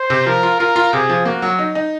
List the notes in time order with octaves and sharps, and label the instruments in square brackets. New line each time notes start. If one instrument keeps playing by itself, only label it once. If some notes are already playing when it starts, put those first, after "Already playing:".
Already playing: [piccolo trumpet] C5
[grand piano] C3
[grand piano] F3 [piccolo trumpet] A#4
[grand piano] F4
[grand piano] F4 [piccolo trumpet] A#4
[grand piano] F4
[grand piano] C3 [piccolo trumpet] G#4
[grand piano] F3
[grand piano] A#3 [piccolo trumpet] F#4
[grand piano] F#3
D#4
D#4